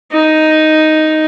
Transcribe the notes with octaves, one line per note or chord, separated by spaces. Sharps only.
D#4